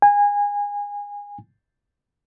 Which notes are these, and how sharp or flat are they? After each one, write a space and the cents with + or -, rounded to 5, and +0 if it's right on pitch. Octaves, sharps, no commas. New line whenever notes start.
G#5 -25